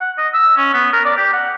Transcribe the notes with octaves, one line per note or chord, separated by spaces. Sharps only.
F#5
D#5
E6
C#4
B3
A#4
D5
G4
F#5